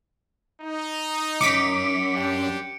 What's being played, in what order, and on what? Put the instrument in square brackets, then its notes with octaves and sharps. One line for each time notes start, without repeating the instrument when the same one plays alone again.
[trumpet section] D#4
[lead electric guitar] C#2 F#2 [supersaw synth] D6 B6 [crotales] C#7 D7
[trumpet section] D4 G4